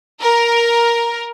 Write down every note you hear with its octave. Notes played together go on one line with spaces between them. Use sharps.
A#4